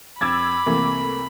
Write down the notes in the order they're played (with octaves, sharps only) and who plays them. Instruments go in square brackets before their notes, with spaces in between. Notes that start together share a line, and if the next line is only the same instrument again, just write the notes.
[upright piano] F2 [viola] B5 [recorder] D6 [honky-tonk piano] E6 G#6 A6
[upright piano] C2 C3 [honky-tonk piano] E3 A3 A#3